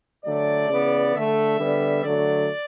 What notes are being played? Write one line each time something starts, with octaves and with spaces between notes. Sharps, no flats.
D3 F#3 A3 D5
C#3 E3 B3
D3 A3 E5
D3 G3 B3
D3 F#3 A3 D5